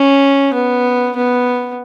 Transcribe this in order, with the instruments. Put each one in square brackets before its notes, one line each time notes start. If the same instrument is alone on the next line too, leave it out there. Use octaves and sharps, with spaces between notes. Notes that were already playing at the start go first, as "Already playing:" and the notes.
Already playing: [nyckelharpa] C#4
B3
B3